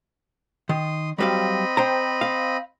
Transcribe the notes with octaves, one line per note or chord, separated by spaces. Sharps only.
D#3 C6 D#6
F#3 G3 C4 D#5 F5 B5
C5 G5 A#5
F5